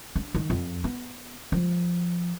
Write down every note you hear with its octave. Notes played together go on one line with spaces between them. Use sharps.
D4
D#3
F2
B3
F3